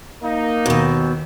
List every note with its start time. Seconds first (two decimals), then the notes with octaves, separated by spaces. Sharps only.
0.23 A#3 D#4
0.66 D#2 B2 C4